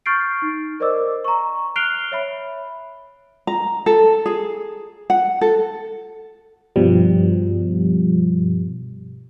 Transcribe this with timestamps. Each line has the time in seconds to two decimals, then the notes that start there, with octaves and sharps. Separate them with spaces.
0.06 C#6 F6 G6 A6 C7 D7
0.42 D#4
0.80 A#4 C5 D5 D#5 D6 E6
1.25 A#5 C#6
1.76 F6 F#6 C7 D7 F7 G7
2.12 C#5 E5 B5
3.47 A#5
3.86 A4
4.26 G#4
5.10 F#5
5.41 A4
6.76 G2 B2 F3 G3